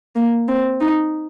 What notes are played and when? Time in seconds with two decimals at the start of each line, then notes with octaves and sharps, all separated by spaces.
0.16 A#3
0.48 C4
0.81 D#4